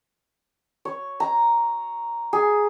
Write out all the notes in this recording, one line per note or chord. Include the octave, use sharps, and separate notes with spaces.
C#5
A#5
G#4